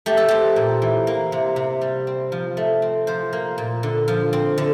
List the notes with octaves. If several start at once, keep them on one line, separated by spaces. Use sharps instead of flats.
A3 G4
A4
C4 G4
A#2
E3
A#3
C3
C3
G3
C4
F3
A3
C4
F3 C5
A#3
A#2
D3
F3
C4
D3